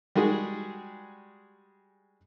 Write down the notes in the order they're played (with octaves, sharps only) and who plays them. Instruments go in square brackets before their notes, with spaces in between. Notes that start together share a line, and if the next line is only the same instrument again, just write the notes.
[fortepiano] G3 G#3 F#4 G#4